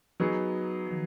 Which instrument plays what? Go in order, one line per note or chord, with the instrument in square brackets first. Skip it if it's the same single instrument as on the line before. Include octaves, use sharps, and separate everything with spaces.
[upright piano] F#3 B3 D#4 G#4
[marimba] F3
D#3